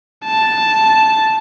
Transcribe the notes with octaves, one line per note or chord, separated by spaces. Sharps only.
A5